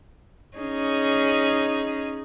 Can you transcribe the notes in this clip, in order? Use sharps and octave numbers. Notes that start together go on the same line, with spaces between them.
C#4 D#4 G#4